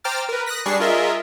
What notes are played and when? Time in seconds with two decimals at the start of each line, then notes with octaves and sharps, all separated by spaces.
0.04 C5 G5 A#5 D6 F6 A6
0.29 A#4 B4
0.46 D#6 F#6 A#6 B6
0.66 G3 D4 G#4 C#6 C7
0.80 F4 G#4 A#4 D#5 E5